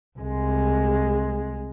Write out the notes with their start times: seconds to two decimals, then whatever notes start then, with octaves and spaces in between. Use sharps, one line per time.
0.19 C2 G#3